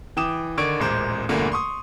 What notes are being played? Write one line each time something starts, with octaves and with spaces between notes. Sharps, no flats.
E3 G5 D6 D#6 E7
D3 D#3 D5 C#6 G#6 D7
D#1 A1 G#3 A#4 C5 D6
E2 G2 A#2 D3 A3 A#3
C6 C#6 D#6